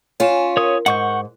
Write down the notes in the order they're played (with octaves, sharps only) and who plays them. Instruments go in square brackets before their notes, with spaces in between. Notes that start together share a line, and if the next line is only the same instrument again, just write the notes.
[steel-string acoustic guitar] C#4 F4 [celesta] C#5 G#5 E7
[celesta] A#4 [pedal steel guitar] C#5 D#6
[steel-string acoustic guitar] G#2 [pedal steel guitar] F#5 C#6 G6